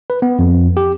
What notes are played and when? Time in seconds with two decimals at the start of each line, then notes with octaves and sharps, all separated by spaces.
0.10 B4
0.22 B3
0.39 F2
0.77 G4